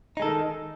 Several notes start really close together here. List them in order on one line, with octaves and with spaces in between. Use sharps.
D#4 G#3 A4 D#3